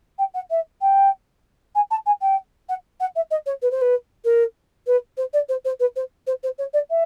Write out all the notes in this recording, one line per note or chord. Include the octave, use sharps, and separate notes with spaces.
G5
F#5
E5
G5
G#5
A5
G#5
G5
F#5
F#5
E5
D#5
C#5
B4
C5
B4
A#4
B4
C5
D5
C5
C5
B4
C5
C5
C5
C#5
D5
E5